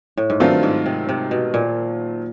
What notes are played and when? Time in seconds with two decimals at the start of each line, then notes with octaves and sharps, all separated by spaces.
0.17 A2
0.30 G#2
0.40 G2 D#3 F#3 A3 C4 F4
0.63 G#2
0.86 C3
1.09 C3
1.31 B2
1.54 A#2